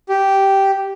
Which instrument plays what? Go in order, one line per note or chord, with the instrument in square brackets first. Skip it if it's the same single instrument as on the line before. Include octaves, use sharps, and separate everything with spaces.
[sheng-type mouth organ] G4